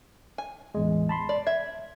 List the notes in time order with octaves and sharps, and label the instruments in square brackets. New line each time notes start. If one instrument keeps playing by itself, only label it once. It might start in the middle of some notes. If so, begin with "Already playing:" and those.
[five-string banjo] G#5
[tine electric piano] A1 E2 G#3
A5 B5 C6
[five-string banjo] D5
[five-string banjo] E5 [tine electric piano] G#6